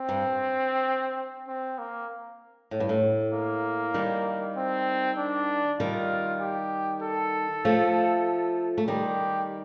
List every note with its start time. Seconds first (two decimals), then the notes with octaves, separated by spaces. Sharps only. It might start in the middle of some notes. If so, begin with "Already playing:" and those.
Already playing: C4
0.09 G2
1.48 C4
1.78 A#3
2.71 A2
2.80 G2
2.89 A2
3.33 A#3
3.94 D#3 G3
4.56 C4
5.18 D4
5.80 D#3 G3 F4
6.41 G4
7.03 A4
7.65 F3 A3
8.78 A3
8.88 D#3 G3 G4